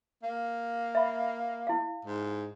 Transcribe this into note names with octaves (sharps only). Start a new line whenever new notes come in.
A#3
E5 B5
E4 F5
G#2